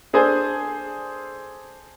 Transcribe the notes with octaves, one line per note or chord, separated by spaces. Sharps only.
D4 G#4 A4 C5 G#5